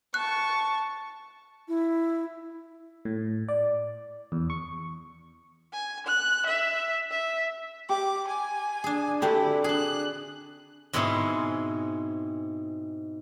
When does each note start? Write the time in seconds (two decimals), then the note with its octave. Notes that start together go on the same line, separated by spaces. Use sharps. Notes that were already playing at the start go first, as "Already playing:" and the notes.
0.14 A5 C#6 F#6
1.68 E4
3.05 A2
3.48 D5
4.32 E2
4.50 C#6
5.73 G#5
6.06 F#6
6.46 E5
7.11 E5
7.89 G4 G5 D6
8.28 G#5
8.84 D4 G#4
9.22 D3 C4 D4 E4 F#4 G4 A4
9.64 D4 G#4 F#6
10.93 G#2 B2 C4 E4 G#4